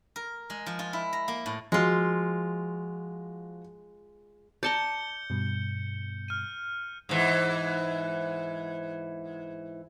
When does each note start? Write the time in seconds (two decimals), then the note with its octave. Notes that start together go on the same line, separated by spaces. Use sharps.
0.16 A#4
0.50 G#3
0.66 F3
0.79 F4
0.93 E4
1.13 A#5
1.28 A#3
1.46 A2
1.72 F3 G#3 F4 F#4
4.63 D5 A5 A#5 G6 C#7 G7
5.30 G2 B2
6.28 F6 D#7
7.09 G#2 E3